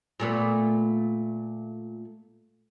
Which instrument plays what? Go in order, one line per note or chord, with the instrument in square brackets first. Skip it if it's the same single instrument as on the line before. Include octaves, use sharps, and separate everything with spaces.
[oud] A#2 A3 B3